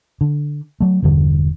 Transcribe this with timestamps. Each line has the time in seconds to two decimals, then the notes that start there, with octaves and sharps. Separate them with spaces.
0.21 D3
0.81 F#3 A3
1.02 E1 E2 G2 D3